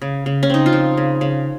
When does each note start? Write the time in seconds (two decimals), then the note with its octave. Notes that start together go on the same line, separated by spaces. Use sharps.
0.02 C#3
0.26 C#3
0.43 C#4
0.50 C4 D#4
0.66 F4
0.73 F3
0.97 C#3
1.21 C#3